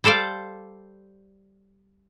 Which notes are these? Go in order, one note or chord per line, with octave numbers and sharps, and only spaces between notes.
G3 A4 C5 D5 F5